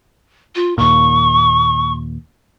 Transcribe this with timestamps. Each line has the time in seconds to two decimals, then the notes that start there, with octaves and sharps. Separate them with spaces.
0.56 F4
0.78 D#2 A#2 C#6